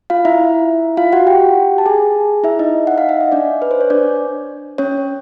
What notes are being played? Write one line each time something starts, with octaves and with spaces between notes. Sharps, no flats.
F4 F5
E4 E5
F4 F5
F#4 F#5
G4 G5
A5
G#4 G#5
E4 E5
D#4 D#5
F#5
F5
E5
D#5
D4 D5
B4
C5
C#5
D4 D5
C#4 C#5